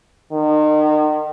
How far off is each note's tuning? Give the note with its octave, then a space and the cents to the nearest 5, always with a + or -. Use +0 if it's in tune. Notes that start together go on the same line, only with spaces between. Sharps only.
D#3 -35